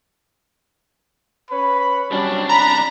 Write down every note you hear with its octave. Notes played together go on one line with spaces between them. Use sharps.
C#4 B4 B5
C2 F#3 G3 C#4 D4
A#5 B5